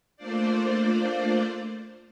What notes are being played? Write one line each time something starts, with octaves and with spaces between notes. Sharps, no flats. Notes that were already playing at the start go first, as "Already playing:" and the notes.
A3 A#3 D4 F4 C5 D5